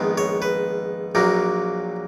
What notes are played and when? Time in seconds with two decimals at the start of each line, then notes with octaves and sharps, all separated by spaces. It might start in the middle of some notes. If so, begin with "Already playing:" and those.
Already playing: A#1 G#2 D#3 G#3 B3
0.18 C#5
0.42 B4
1.15 A#1 A#2 F#3 A#3